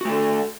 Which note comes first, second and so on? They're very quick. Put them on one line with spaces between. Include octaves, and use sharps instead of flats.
F#4 A3 A4